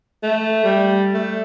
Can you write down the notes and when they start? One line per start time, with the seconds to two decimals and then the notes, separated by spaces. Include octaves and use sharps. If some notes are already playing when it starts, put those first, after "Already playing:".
0.23 A3
0.64 G3
1.14 A3